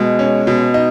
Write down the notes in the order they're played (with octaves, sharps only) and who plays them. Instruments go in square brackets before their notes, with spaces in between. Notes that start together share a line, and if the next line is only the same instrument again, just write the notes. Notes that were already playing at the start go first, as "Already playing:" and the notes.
Already playing: [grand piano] B2 [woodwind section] G#3
[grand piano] C#4
B2
D#4